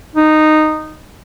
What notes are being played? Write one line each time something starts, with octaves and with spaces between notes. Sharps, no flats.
D#4